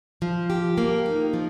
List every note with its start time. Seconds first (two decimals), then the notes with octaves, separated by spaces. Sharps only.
0.22 F3
0.50 G4
0.78 A#3
1.06 D#4
1.33 F3